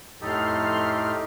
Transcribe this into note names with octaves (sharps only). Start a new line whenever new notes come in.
F2 A2 D#4 G4 A4 C6 F6